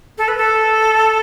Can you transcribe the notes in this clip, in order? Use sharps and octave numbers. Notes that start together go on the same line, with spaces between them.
A4
B4
A4